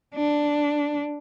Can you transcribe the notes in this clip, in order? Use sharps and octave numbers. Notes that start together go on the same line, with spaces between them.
D4